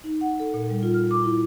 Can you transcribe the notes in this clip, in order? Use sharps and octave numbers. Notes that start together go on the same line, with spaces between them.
D#4
F#5
A4
A#2
G3
F4
F6
D6
E4